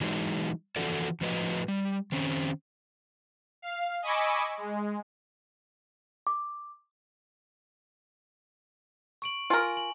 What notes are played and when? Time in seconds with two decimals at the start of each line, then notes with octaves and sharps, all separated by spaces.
0.01 E3 F#3 G#3 D#4
0.76 D3 E3 F3 F#4 A4 D5
1.21 A2 F3 F#4 B4 D#5
1.68 G3
2.12 D#3 C4 C#4
3.62 F5
4.02 D#5 G#5 B5 C#6 D6 E6
4.57 G#3
6.27 D6
9.22 C#6 D7 F#7
9.50 F4 A#4 G#5
9.77 F#7